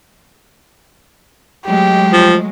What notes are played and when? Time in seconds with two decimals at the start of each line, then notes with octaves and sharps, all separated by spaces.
1.66 F#3 G#3 A3 G4
2.13 F3